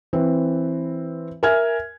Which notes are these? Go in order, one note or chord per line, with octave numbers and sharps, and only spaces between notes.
E3 C4 B4
A#4 E5 G#5 F6 G#6